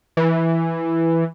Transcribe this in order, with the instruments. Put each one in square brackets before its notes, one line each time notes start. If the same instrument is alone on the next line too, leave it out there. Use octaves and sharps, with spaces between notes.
[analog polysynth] E3